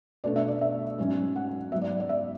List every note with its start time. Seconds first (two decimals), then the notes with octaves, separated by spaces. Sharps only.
0.24 B2 A3 D4 D5
0.36 E5
0.48 D5
0.61 E5
0.98 G#2 F#3 C#4
1.36 F#5
1.72 G#2 F#3 B3 E5
1.81 D5
2.00 D5
2.09 E5